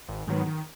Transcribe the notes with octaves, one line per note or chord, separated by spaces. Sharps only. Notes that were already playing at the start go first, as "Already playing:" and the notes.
G#1
G#2 D#3 F#3 B3
D#3